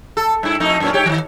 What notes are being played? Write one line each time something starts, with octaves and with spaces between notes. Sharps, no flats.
A4
G2 E4
F2 A3 D#4
F#2 A#2 C#4
G2 G4 C#5
D#3 F3